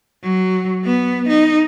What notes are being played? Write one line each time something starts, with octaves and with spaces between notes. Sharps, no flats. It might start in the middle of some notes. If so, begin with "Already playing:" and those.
F#3
B3
D#4